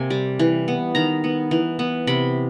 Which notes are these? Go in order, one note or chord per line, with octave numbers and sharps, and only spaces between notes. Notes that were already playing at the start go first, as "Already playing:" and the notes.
Already playing: C3 A#3 G#5
G3
E3
B3
D#3 A#5
B3
E3
B3
C3 B5